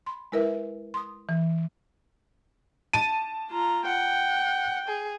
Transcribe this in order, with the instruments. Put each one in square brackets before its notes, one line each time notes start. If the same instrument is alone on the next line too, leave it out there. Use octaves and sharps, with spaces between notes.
[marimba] B5 C6
G#3 E4 A#4 B4 E5
C6 D#6
E3
[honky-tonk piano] A5 D#7
[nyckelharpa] F4 A#5
[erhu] F#5 [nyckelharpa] G5
[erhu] G#4